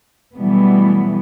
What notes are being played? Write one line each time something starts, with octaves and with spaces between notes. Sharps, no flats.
B2 E3 F#3 G3 A3 B3